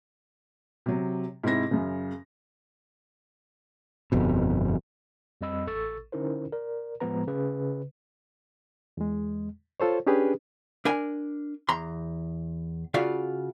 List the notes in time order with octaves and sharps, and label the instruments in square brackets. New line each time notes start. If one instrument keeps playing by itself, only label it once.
[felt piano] C3 F#3
G#2 C3 C4 E4 A#6
F#2 C#3
[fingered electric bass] G1 F2 B2
[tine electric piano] F2 G3 C4 D#5 B5 E6
A1 A4 C#6 E6 A6
D3 C#4 D#4 E4 A#4 C5
A#4 D5
A2 F3 G#3 B3 B4 A#5
C#3 B4
[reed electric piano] E2 G#3
F4 A4 C5 C#5
C#4 D4 G4 G#4 B4
[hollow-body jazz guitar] D4 A#4 G#5
E2 A#5 C6
C#3 F4 F#4 D5 F5